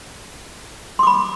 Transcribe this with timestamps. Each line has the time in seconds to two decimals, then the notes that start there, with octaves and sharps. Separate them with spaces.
0.99 C6
1.03 D6
1.07 B5